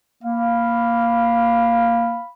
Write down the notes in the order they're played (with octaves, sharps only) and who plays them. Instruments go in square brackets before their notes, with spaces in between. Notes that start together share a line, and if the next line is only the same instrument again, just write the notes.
[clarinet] A#3 [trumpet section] F5 B5